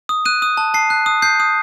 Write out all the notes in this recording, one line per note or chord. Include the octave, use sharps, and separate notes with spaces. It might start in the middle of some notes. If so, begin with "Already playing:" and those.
D#6
F#6 D#7
D#6
A5
A5 C7
F#6
D#6
G6 C7
D#6